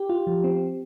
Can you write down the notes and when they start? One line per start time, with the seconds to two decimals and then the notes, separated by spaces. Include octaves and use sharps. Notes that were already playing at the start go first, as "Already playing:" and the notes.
Already playing: G4
0.09 F4
0.27 F3
0.44 C4